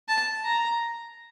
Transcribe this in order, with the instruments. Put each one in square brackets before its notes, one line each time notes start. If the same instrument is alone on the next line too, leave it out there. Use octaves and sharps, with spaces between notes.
[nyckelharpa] A5
A#5